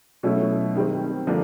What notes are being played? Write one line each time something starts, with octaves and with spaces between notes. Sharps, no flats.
B2 F#3 A3 C#4 E4
D#3 G3 C4
D3 F3 A#3 D4